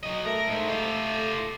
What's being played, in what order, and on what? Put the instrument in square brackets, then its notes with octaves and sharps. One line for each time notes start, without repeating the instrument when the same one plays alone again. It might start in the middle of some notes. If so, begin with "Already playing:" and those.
[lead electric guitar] F#3 D#5
[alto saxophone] A3 [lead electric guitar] A#4
[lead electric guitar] G#2
F4 G4